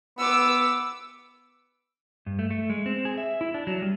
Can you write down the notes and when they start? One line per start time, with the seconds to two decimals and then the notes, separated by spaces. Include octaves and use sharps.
0.18 B3 D6 E6
2.26 G2
2.39 A3
2.51 A3
2.70 G#3
2.86 C4
3.05 G#4
3.17 E5
3.41 E4
3.54 D4
3.67 F#3
3.82 G3